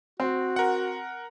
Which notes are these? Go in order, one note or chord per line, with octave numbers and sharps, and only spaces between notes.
C4 F#4
A#4 F#5